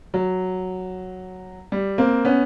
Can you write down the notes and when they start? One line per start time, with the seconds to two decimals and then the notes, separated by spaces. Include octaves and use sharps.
0.14 F#3
1.72 G3
1.98 A#3 C4
2.25 B3 C#4